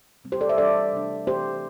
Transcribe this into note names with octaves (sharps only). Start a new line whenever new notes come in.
C3 G3 C4
G4 C5
A4 D5
C5 E5
E3 G3 D4 A4 D5
C3 A3 D4
E3 A3 C4 G4 C5